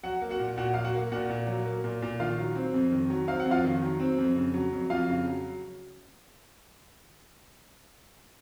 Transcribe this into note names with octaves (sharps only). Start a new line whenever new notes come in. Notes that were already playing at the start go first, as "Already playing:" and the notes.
F#3 F#4 F#5
A#3
F#4 F#5
A#2
A#2 F#4 F#5
F#3 F5
F#4 F#5
A#3
A#2 F#4 F#5
A#2
F#3
A#3
A#2
A#2
D#3 F4 F5
F#3
C4
F2
D#3
F#3
C4 F5
F#5
F2
F4 F5
D#3
F#3
C4
F2
C#3
F#3
F2
F2 F4 F5
C#3
F#3